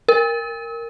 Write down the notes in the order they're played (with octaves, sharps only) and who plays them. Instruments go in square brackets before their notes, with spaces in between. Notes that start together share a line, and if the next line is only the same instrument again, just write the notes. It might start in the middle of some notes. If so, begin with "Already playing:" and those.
[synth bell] A#4